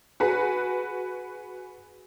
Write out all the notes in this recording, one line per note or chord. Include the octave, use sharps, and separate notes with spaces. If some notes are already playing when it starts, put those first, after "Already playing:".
F#4 G#4 B4